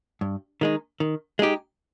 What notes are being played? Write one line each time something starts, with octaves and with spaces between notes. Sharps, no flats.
G2
D#3 G#3 D#4
D#3
G#3 D#4 G4